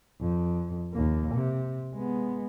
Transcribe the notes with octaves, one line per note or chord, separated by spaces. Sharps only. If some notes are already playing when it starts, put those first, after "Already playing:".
F2
D#2 A#3
C3
G#3 B3